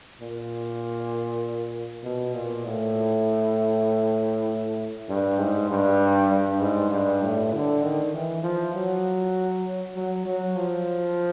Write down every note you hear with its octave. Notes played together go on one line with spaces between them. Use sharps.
A#2
B2
A#2
A2
G2
G#2
G2
G2
G#2
G2
A2
D3
D#3
E3
F3
F#3
F#3
F#3
F3